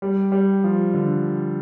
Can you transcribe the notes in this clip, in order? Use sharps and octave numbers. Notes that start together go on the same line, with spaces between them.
G3
G3
F3
D3